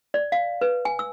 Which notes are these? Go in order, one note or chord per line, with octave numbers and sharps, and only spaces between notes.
D5
F5
B4
G#5
E6